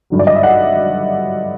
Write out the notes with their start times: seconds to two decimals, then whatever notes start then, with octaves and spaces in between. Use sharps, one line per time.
0.10 G#1 G2 D3 F#3
0.19 D5
0.27 D#5
0.36 E5
0.43 F#5